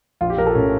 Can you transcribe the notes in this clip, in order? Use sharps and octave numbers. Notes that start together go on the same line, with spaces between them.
A#1 F4
G4
A#1 A#4
A4
A2 C#4